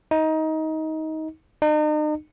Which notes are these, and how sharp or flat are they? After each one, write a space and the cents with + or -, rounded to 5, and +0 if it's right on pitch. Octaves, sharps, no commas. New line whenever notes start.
D#4 +20
D#4 -40